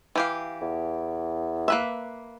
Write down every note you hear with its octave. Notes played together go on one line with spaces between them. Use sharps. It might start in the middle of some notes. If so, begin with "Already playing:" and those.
E3 G4 F5
E2
A#3 B4 E5